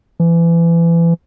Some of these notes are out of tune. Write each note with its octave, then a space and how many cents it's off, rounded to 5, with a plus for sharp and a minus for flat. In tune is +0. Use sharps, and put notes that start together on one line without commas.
E3 +30